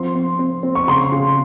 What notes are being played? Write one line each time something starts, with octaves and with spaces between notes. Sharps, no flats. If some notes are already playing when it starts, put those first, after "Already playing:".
Already playing: F3 C4 C6
C4
C4
C4
C#6
C#3 C6
C#3